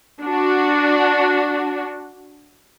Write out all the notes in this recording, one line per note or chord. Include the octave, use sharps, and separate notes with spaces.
D4 F#4